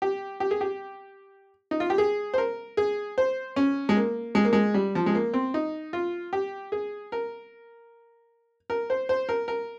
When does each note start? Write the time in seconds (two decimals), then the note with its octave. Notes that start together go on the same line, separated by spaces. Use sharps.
0.02 G4
0.40 G4
0.51 G#4
0.61 G4
1.71 D#4
1.80 F4
1.90 G4
1.98 G#4
2.34 C5
2.38 A#4
2.77 G#4
3.18 C5
3.56 C#4
3.89 G#3
3.97 A#3
4.35 G#3
4.45 A#3
4.53 G#3
4.74 G3
4.95 F3
5.06 G#3
5.15 A#3
5.34 C4
5.54 D#4
5.93 F4
6.33 G4
6.72 G#4
7.12 A#4
8.70 A#4
8.90 C5
9.09 C5
9.29 A#4
9.48 A#4